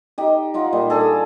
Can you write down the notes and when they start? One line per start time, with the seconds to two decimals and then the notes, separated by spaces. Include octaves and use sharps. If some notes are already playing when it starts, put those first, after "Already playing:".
0.18 D#4 G4
0.54 D#4 F4 F#5
0.73 A#2 G3
0.90 D4 G#4 A4